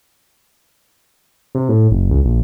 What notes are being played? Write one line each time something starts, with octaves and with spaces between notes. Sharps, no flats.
C3
A2
F#1
C#2
A#1